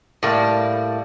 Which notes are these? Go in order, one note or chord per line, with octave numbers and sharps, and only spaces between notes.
A2 G3 A#3